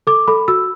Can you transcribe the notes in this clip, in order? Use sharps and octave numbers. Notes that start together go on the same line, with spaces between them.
A4 D6
A4 B5
F#4 E6